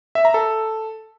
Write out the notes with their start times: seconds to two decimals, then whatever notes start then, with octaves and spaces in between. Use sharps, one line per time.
0.15 E5
0.25 A#5
0.34 A4